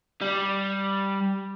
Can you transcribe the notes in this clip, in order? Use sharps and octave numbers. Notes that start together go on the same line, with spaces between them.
G3